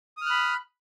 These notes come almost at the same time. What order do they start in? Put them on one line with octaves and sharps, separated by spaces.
D#6 F6 F#6 B5